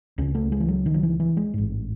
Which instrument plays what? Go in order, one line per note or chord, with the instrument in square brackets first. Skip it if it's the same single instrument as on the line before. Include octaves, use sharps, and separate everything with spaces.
[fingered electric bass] C#2 C#3 C#4
A3
G#3
E3
F#3
D#3
F#3
E3
E3
G#3
A1 G#2